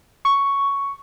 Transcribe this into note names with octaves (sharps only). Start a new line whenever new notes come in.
C#6